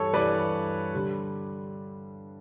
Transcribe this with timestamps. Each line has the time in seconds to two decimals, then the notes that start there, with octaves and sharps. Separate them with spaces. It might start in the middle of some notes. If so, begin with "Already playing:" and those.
Already playing: G2 E3 G3 A4 C#5
0.13 G2 E3 G3 B4 D5
0.94 D3 G3